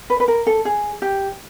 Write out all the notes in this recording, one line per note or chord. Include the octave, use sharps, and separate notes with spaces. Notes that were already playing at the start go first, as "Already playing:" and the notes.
B4
B4
A#4
A4
G#4
G4